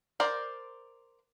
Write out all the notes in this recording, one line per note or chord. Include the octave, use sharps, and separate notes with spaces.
A#4 C5 D5